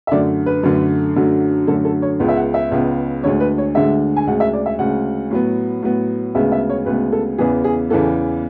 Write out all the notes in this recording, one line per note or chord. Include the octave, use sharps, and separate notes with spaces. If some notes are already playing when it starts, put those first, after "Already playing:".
E5
F#2 D3 A3 D5
B4
F#2 D3 A3
F#2 D3 F#3 A3
F#2 D3 F#3 A3 A4
A4
C#5
C#2 C#3 G#3 B3
E5
F#5
E5
C#2 C#3 G#3 B3
D2 D3 G#3 C#5
B4
C#5
D2 D3 G#3 E5
G#5
D2 C#3 G#3 F#5
E5
D5
E5
D2 C#3 G#3 F#5
A2 F#3 B3
A2 F#3 B3
D2 C#3 G#3 B3 E5
E5
C#5
D2 C#3 G#3 B3 B4
A4
E2 C#3 E3 B3 G#4
G#4
E2 C#3 E3 B3 A4